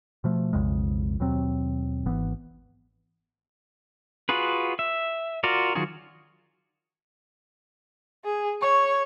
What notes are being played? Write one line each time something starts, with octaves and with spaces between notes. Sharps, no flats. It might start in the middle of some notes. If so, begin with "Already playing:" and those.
B2 F3 A3
B1 F2 C#3 G#3
D#2 B2 F#3 C4
G#1 E3 B3
F4 F#4 G#4 B4
E5
F4 F#4 A#4 D5
D#3 F#3 F4 F#4 G#4
G#4
C#5 C#6